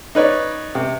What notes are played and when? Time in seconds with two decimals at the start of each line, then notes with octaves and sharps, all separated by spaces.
0.15 D#4 B4 C#5 D5
0.75 C3